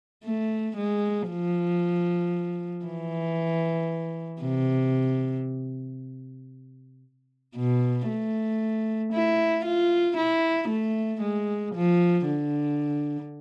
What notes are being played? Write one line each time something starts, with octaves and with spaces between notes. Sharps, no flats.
A3
G#3
F3
E3
C3
B2
A3
E4
F4
E4
A3
G#3
F3
D3